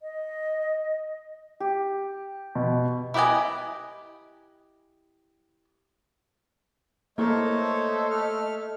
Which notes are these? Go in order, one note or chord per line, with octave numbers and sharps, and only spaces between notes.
D#5
G4
B2
E4 G4 B4 D#5 G#5
A3 A#3 E4 A4 A#4 C5 C#5 D#5
A3 F6